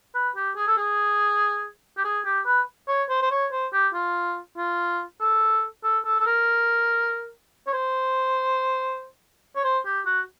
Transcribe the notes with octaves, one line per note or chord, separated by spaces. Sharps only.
B4
G4
G#4
A4
G#4
G4
G#4
G4
B4
C#5
C5
C5
C#5
C5
G4
F4
F4
A4
A4
A4
A4
A#4
C#5
C5
C#5
C5
G4
F#4